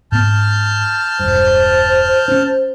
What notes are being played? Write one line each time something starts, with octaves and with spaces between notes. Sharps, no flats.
G#2 B3 A5 F6 G6
E1 G2 C5
C#4 D4